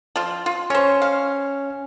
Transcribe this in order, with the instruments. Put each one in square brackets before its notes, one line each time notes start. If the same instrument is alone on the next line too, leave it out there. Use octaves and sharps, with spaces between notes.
[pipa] F3 F4
F4
[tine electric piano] C#4 [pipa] C5 C#5
[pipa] F5